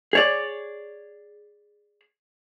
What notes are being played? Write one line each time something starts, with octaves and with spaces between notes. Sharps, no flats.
G#4 C#5 D5